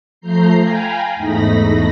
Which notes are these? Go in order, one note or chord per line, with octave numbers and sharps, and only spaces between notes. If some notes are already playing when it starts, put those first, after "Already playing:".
F3 A3 A#5 G6 C7
F5 G5 G#5 A#5 B5
E2 G#2 A3 D#4 B5 A#6